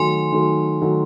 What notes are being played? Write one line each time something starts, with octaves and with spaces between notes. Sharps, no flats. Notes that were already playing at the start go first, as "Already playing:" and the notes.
Already playing: D#3 F#3 A3 G#5 C6
D#3 F#3 A3
D#3 F#3 A3